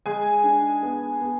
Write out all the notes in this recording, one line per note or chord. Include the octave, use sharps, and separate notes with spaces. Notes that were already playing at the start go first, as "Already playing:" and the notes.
G#3 G#4 G#5
D4
B3
B3